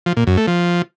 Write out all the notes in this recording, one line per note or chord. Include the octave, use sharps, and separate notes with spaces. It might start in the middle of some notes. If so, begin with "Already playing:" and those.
F3
A#2
F#2
A3
F3